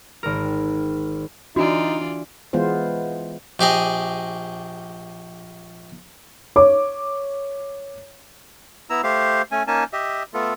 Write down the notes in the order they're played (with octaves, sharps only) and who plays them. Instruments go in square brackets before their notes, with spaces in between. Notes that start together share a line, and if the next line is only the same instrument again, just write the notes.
[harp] G#1 A#4
[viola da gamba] E3 F4 D5 [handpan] D4 [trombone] D#4 [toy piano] F#4
[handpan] E3 G#3 B3 F4 C5
[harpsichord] A#1 G4 G#4 D#5
[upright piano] C#5 D6
[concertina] B3 E4 A#5 E6
A3 G4 C5 F5
A3 C#4 G#5
A#3 C#4 D#4 G#5 A5
G4 D#5 E5
A3 B3 F4 A4